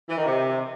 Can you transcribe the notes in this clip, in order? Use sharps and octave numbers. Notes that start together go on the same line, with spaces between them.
E3
D#3
C3